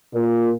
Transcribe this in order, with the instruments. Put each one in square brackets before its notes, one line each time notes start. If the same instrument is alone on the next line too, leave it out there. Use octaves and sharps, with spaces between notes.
[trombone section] A#2